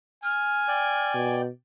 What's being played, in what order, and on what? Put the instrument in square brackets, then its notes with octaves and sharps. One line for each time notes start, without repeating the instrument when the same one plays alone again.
[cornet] G#5 [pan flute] F6
[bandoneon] D5 G5
[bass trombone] B2